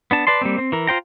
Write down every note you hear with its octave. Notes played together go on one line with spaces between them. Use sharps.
B3 D4 A5
B4 D5 A5 C6
G3 A#3 C4
C4
E3 A#4
F4 C5 G5 A#5